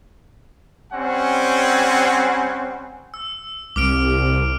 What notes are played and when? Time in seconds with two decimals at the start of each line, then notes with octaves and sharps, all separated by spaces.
0.92 G3 C4 C#4 F#5 G#5
3.14 E6
3.76 C2 D6 F6 D7